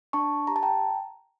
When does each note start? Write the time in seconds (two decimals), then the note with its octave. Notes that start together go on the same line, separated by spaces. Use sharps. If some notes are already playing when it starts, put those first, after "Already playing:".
0.13 D4 A5 C#6
0.47 G4 A#5
0.56 A5
0.63 G5 A#5